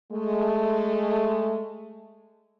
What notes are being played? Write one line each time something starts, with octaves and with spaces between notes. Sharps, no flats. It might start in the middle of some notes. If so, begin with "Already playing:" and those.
G#3 A3